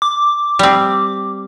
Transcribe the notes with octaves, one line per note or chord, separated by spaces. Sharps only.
D6
G3 C4